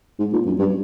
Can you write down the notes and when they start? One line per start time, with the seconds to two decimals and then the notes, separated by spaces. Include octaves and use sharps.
0.19 G#2
0.33 A#2
0.46 F#2
0.59 G2